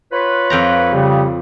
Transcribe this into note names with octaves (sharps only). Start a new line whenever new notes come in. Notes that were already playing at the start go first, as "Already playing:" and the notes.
F4 B4 C#5 B5
F2 G5 A#5
C#3 G3